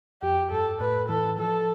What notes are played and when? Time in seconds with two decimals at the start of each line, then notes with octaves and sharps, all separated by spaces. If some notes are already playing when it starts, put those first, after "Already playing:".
0.22 F2 G4
0.51 G2 A4
0.80 A2 B4
1.09 E3 A4
1.38 F3 A4